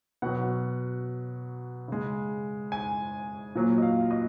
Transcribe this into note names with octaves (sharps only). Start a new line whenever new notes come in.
B2 F#3 F#5
C#3 G#3
G#5
A#2 F#3
D#5
F5
D#5